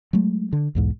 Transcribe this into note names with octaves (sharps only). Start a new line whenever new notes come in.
F#3 G#3 A3
D3
B1 E2 G#2